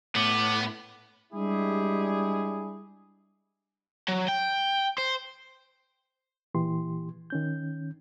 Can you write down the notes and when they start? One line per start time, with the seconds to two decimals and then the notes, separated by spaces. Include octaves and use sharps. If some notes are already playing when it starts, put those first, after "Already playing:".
0.15 A2 B3 D6
1.33 G3 G#3 D4 E4 G4 G#4
4.08 F#3
4.28 G5
4.98 C5
6.55 A#2 E3 G4 C6
7.30 D#3 C#4 G6